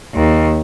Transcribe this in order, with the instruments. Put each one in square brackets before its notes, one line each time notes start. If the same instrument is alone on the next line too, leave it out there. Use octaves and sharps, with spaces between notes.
[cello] D#2